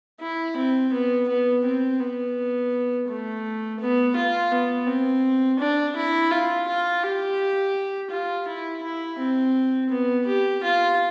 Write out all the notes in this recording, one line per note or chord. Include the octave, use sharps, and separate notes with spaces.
E4
C4
B3
B3
C4
B3
A3
B3
F4
B3
C4
D4
E4
F4
F4
G4
F4
E4
E4
C4
B3
G4
F4